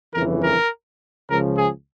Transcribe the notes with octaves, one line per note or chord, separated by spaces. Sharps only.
G1 F2 C#3 E3 A#4
A#4
C#2 C#3 F3 A#4
G#4